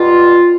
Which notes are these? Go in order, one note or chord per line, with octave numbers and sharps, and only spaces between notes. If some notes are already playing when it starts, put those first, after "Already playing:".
Already playing: B2 G3 F4